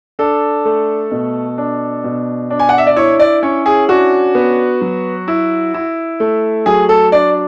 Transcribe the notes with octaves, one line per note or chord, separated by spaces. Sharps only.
D4 A4
A3
B2
D4
B2
D4
G#5
F#5
E5
D5
E4 C#5
D5
C#4 C#5
G#4
D4 F#4
B3
F#3
E4
E4
A3
F#3 G#4
A4
D4 D5